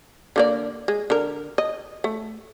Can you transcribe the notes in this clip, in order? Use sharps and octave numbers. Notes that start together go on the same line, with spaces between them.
D3 A#3 D5
G#3
D3 A#4
D#5
A3